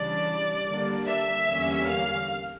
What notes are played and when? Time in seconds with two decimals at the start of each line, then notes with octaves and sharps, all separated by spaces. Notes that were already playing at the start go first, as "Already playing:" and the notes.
Already playing: C#3 E3 G3 D4 D5
0.67 D3 G3 A#3 D4
1.08 E5
1.49 E2 D3 G3 A#3 C#4
1.89 F5